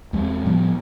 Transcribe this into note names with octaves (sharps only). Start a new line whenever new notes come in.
E2 G#3 A3 C4
A2 F3 G3 B3